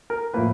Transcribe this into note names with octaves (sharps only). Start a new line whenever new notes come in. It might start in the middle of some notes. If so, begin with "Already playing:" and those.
A#4
A2 F3 A#3 B4